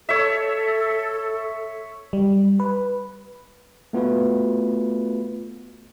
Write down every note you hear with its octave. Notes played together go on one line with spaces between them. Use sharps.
A4 C#5 E5
G3
B4
A3 B3 F4 F#4 B4